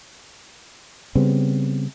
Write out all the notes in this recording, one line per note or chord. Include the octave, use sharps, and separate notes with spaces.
C#3 G3 B3 C4